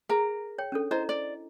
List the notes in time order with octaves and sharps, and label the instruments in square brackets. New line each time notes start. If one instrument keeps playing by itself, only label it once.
[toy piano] G#4 [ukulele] A#4 A#5
[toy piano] C#5 G5
C#4 D4 A4
[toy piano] E4 D#5 A#5 [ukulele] C5
[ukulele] D5